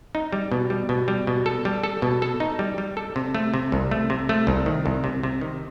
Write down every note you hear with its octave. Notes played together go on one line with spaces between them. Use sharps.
D#4
G3
B2
G3
B2
G3
B2
A4
G3
A4
B2
A4
D#4
G3
G3
A4
C3
A3
C3
C2
A3
C3
A3
C2
D#3
C2
C3
C3
D#3